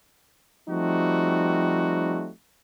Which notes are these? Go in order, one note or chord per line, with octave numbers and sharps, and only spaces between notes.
F3 G3 A3 C4 D#4 F#4